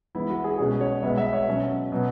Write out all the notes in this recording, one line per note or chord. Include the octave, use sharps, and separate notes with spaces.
E3 G#3 B3 E4
F#4
G#4
B2 G#3 C#4 G#4
C#5
B2 G#3 B3 E5
E5
C#5
B2 F#3 C#4
B2 F#3 B3